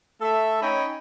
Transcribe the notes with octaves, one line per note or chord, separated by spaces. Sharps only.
A3 A4 E5
C#4 D#4 C#5 D#5 G5 B5